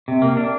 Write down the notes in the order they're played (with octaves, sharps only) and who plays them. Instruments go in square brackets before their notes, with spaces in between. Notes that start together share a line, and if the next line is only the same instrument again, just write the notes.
[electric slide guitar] C3
A#3
D4